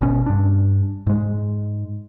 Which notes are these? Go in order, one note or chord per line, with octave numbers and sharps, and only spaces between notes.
G#1 B2 C#4
G2 D4
G#2 G#3